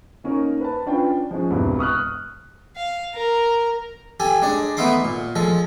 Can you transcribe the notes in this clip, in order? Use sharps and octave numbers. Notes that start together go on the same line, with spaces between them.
A#3 C#4 D#4 A#4 C#5
B4 A5
C#4 D4 F4 B4 G5
F3 G#3 C#4
E1 C2 G2
C#6 D#6 F6 F#6
F5
A#4
G4 A4 G#5
G#3 D4 D5
A3 B3 D#4 E5 C6 D6
A#2
F3 G#3 A4